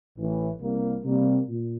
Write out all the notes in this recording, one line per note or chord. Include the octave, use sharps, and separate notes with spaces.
A1 A2 E3
C2 C3 G3 A#3
C3 G3 A#3
A#2